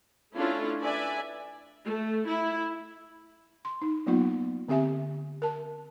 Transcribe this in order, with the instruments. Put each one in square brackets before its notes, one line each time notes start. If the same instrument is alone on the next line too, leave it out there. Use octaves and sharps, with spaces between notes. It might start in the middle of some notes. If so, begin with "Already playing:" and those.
[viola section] A3 C#4 D4 E4 F4 A4
B4 D5 E5 G#5
[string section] A3
E4
[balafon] C6
D#4
F#3 A#3 B3 D#4 F4
D3 C4 G4 E5 G#5
A#4 A5